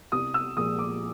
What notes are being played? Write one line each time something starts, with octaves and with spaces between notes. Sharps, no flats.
C2 D#6
E6
A#2 F3 G#3 D#6
D6